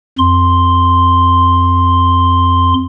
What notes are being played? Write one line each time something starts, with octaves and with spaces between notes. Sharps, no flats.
F2 C6